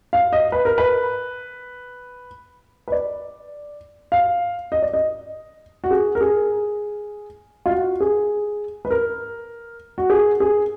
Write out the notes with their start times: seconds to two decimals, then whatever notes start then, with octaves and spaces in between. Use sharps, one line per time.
0.13 F5
0.33 D#5
0.52 B4
0.65 A#4
0.78 B4
2.88 B4
2.92 D5
4.12 F5
4.72 D#5
4.82 D5
4.93 D#5
5.84 F#4
5.91 G#4
6.15 A#4
6.21 G#4
7.66 F4
7.71 F#4
8.00 G#4
8.85 B4
8.91 A#4
9.98 F#4
10.10 G#4
10.40 G#4